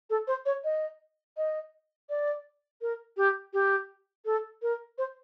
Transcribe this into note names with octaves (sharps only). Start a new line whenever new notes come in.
A4
C5
C#5
D#5
D#5
D5
A#4
G4
G4
A4
A#4
C5